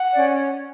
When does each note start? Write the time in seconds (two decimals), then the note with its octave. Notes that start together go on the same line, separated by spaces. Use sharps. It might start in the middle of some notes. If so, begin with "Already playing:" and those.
Already playing: F#5
0.12 C#4 D5